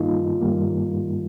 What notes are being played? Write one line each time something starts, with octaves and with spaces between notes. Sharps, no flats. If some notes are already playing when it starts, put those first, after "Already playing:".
Already playing: G2 D#3 G3 A#3 D#4 F4
G2 D#3 G3 A#3